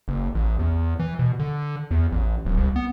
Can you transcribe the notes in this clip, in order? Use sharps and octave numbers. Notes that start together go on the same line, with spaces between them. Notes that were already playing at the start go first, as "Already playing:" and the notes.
F#1
A1
E2
E3
B2
D3
E2
A1
D1
C2
B3